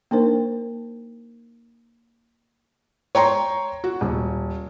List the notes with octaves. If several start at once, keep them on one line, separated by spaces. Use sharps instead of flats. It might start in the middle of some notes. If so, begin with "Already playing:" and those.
A#3 D4 D#4 A#4 C5
C#5 G5 A#5 C6
F#4
D#1